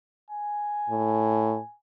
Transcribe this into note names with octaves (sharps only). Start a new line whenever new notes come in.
G#5
A2